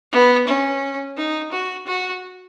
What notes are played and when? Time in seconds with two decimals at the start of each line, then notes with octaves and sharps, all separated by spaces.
0.12 B3
0.47 C#4
1.17 D#4
1.52 F#4
1.87 F#4